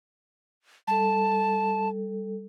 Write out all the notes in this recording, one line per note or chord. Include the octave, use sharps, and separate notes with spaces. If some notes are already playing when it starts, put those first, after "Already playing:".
G3 A4 A5